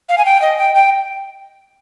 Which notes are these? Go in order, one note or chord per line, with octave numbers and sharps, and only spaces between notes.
F5
G#5
G5
D#5
G5
G5